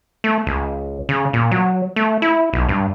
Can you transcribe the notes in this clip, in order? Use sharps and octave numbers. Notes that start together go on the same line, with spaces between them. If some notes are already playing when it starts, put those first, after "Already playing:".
A3
C#2
C#3
A#2
F#3
A3
E4
B1
G2